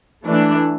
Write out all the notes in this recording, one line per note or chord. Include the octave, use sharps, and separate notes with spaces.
E3 A3 D4